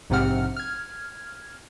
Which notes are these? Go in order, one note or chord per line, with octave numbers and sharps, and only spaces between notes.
A#1 G#2 C3 C4 F#5 F6
F6 G#6